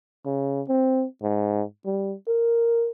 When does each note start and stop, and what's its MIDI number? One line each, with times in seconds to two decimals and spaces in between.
0.25 0.62 49
0.69 1.05 60
1.23 1.62 44
1.86 2.15 55
2.28 2.90 70